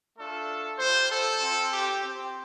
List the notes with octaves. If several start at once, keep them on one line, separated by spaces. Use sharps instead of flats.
A3 D4 F4 A4
G3 F4 C5
A4
C4 F4
G4
C4
G4